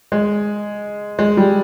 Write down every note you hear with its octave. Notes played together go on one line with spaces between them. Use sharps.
G#3
G#3
G3